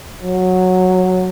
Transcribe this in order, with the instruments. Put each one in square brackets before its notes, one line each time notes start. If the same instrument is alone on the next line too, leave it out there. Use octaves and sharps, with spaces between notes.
[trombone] F#3